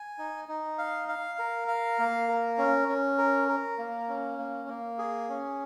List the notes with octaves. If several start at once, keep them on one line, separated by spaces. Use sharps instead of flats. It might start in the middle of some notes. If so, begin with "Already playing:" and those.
Already playing: G#5
D#4
D#4
F5
F5
A#4
F5
A#3
A#4
C#4
C#4
A#4
A#4
A#3
C#4
A#3
A#3
G#4
C#4